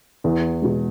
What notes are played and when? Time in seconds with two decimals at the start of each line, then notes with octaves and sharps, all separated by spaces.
0.24 E2
0.62 B2 G#3